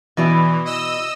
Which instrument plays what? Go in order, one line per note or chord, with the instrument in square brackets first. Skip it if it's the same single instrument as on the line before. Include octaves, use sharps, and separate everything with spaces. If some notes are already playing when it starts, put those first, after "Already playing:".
[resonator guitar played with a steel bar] B2 E4 D5 [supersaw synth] E3
[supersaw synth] D#5 E6